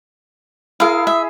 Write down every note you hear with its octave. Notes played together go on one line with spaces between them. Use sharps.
E4 G#4 A#4 F5
E5